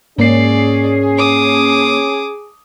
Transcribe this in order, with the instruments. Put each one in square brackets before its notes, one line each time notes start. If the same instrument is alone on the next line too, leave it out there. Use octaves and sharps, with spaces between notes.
[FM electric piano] G#2 A#3 C7 [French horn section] C#4 [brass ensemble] G#4 [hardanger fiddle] D5
[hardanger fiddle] D6 D#6